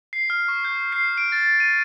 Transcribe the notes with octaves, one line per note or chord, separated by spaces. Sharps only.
C7
F6
C#6
G6
C7
D7
A6
D#7